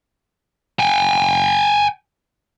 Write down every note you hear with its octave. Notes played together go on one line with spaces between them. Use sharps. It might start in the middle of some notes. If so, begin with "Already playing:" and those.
G5 G#5